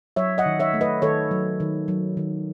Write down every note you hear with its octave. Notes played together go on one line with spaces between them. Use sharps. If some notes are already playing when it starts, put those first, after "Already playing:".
F#3 C#5 E5
D#5 F#5
D#3
C#5 E5
A3
B4 D#5
D#3 A4 C#5
F#3
D#3
F#3
D#3